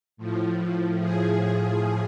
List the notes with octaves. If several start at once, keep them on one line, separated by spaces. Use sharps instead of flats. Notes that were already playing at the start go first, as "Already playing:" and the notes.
A2 F3
G#4